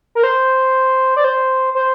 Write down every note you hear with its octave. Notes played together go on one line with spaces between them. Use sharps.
A#4
C5
D5
C5
C5